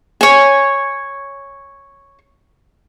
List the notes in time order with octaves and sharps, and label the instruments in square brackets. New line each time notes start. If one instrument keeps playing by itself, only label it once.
[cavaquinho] C#5 G#5